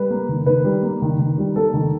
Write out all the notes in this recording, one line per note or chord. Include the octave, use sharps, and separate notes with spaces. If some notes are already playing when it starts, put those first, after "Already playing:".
Already playing: G3 B4
A#3
D#3
D#3 B4
G3
A#3
D#3
D#3
G3
A#3 A4
D#3